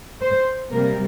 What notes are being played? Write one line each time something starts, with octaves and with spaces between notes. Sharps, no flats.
C5
C3 G3 A#3 A#4